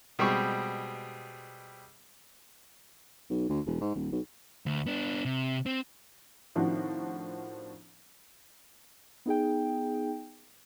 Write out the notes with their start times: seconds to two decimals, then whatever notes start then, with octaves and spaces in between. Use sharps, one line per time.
0.19 B2 G3 G#3 C4 C#6
3.30 B1
3.50 D2
3.66 E1
3.81 G#2
3.95 D#1
4.12 B1
4.66 D2
4.86 B3 D4
5.25 C3
5.66 C4
6.55 A2 D#3 F3 C4 D4 F#4
9.26 B3 D#4 G#4 G5